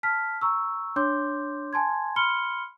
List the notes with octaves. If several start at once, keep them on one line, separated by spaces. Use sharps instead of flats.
A5 F6 B6
A#5 C#6 E6
D4 C#5 C6 D6 G6
G#5 A5 C6 G#6
B5 C6 F6 C#7 G7